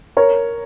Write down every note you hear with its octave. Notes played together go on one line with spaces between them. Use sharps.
A#4 C#5